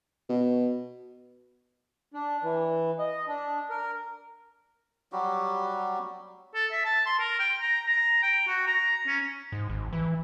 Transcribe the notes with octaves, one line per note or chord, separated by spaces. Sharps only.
B2
D4
E3
D#5
D4
A#4
F#3 G3 F#4 G4
A4
E5
A5
C6
A#4
G5
A#5
A#5
G5
F#4
A#5
C#4
G#2
G#1
E3